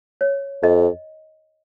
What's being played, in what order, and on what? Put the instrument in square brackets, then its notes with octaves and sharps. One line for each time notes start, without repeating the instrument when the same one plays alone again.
[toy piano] C#5
[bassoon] F2 [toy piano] D#5